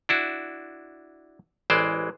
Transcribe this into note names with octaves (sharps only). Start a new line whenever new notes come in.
D4 E4 F#4
A1 E3 G#3 C5 D5